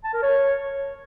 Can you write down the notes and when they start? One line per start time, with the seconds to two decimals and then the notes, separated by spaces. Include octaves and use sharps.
0.04 A5
0.13 A#4
0.23 C#5